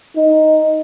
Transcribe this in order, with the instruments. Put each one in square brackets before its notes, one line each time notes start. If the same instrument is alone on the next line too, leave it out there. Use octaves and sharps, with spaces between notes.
[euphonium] D#4